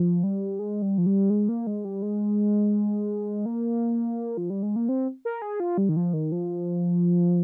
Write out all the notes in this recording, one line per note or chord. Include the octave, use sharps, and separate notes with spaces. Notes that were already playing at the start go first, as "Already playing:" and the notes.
Already playing: F3
G3
G#3
G3
F3
G3
G#3
A#3
G#3
G3
G#3
A#3
F3
G3
G#3
A#3
C4
A#4
G#4
F4
G3
D#3
F3
D#3
F3